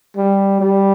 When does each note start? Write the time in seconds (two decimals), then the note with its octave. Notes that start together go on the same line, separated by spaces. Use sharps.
0.17 G3
0.60 G3